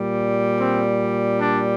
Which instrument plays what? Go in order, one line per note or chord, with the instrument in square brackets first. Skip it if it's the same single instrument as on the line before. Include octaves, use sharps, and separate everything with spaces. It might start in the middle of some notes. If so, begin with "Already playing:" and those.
Already playing: [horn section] A#2 G3
C4
D4